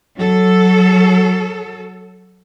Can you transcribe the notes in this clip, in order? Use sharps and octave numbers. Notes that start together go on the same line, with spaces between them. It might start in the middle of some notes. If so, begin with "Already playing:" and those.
F#3 A4